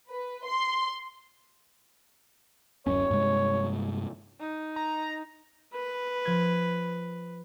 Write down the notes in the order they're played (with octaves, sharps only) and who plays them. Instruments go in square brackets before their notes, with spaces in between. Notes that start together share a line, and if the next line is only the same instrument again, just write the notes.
[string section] B4
C6
[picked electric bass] D1 F#2 C#4 [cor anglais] C#5
[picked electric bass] G2 C3 G#3
[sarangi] D#4
[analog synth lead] A#5
[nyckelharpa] B4
[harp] F3 G#6